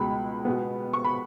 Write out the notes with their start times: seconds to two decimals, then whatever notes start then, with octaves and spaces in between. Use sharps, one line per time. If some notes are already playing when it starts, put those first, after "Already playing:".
Already playing: C#2 B2 G#3 B5
0.45 B2 G#3 B3
0.93 C#6
1.04 B5